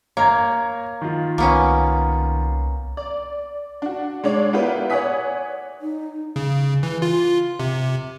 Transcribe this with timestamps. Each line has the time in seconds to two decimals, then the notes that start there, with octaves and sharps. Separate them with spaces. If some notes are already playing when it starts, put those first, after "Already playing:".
0.17 A#3 C#5 A#5 G#6
1.01 D#3 F4
1.38 C2 A#3 B3 C#4
2.97 D5
3.82 D4 F#4
4.24 G#3 D4 C#5 D5
4.53 A#3 B3 E4 F4 G4 B4
4.90 C#5 D5 F#5 G#5 D#6 B6
5.81 D#4
6.36 C#3
6.83 E3
7.02 F4
7.59 C3